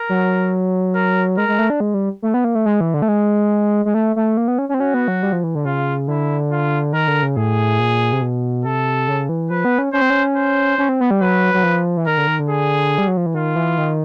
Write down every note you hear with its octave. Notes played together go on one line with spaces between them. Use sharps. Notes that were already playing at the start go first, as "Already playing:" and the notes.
Already playing: A#4
F#3
A#4
G#3 A#4
G#3
A3
D4
G#3
G3
A3
B3
A#3
A3
G#3
E3
D3
A3
G#3
G#3
A3
A3
A#3
B3
C#4
C#4
C4
C#4 F#4
B3
F#3
G3
F3
E3
D3
C#3 F4
D3 E4
F4
D#3 A#4
D3
C#3
A2 G#4
A#2
C3
B2
C3 A4
C#3
E3
F3 B4
B3
C#4
C#4 C5
C4
C#4
C5
C#4
C4
B3
G3
F#3 B4
F#3
F3
E3
D#3 A#4
D3
D#3
D3
G#4
G3
F#3
F3
E3
D#3 F4
E3
D#3